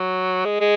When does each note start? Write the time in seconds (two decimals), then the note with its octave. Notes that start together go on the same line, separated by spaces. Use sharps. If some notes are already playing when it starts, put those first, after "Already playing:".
Already playing: F#3
0.45 G#3
0.60 G#3